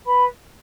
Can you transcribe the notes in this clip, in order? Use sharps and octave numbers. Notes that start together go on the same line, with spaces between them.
B4 B5